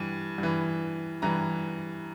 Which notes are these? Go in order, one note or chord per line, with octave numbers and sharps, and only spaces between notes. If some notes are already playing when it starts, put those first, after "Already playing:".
Already playing: G2 E3
G2 E3
G2 E3 A#5